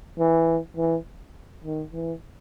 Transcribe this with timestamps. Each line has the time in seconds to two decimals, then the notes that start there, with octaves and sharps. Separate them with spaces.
0.19 E3
0.77 E3
1.64 D#3
1.93 E3